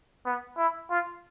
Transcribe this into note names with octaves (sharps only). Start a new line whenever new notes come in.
B3
E4
F4